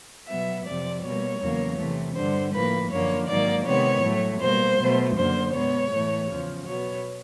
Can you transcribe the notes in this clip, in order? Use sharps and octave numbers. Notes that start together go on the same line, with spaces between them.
B2 F#3 B3 E5
F2 C3 F3 D5
B2 G3 A#3 C#5
E2 C#3 F#3 A#3
C3 E3 A3
G2 D3 G3 C5
A2 F3 A#3 B4
F#2 D3 F3 A#3 C#5
G#2 D#3 F#3 A#3 D5
C3 D#3 G#3 B3 C#5
A2 F#3 A3
B2 G3 A#3 C5
B2 F#3 A3
F#2 D3 F#3 A#3 C5
B2 G#3 B3 C#5
A2 E3 A3
E2 C#3 F3
B2 F#3 B3 C#5